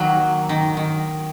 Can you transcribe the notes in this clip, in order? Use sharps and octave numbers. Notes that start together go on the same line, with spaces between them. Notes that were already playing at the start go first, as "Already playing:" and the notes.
Already playing: D#3 F#3 A#3
D#3
D#3